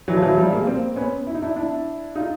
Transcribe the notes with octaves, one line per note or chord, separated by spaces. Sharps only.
E3 F#3
F3
E3 F#3
F3 G3
G#3 A#3
A#3 C4
B3 C#4
E4
D#4
D4 E4
D4 E4
D#4 F4